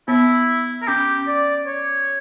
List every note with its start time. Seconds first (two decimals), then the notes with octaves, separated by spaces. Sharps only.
0.08 B3 E4
0.82 A#4
0.88 C#4 G4
1.27 D5
1.67 C#5